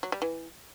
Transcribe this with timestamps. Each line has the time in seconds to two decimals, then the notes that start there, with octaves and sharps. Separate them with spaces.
0.03 F#3
0.12 G3
0.22 E3